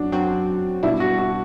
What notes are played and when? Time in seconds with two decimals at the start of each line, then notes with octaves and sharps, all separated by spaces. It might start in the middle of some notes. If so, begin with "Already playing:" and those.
Already playing: F#2 F#3 D4 F#4
0.12 F#2 F#3 C4 F#4
0.83 B2 G3 D4 E4
1.00 F#4
1.18 F#4